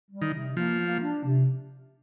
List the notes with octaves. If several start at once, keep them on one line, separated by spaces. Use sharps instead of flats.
G3
D#3
C3
F3 A#3
A#3
D4
C3